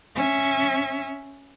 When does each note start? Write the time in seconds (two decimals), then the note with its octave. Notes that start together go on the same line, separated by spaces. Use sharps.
0.16 C#4 E5